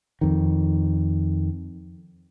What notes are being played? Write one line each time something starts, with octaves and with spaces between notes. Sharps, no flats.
F2 D#3